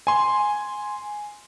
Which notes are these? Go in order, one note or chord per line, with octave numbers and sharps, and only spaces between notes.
G#5 C6